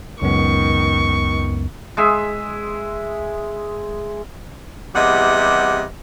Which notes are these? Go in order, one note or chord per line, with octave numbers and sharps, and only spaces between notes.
C#2 F#2 D#3 B3 C#6
G#3 G#4 E5
E2 C3 G3 D#5 E5 F#5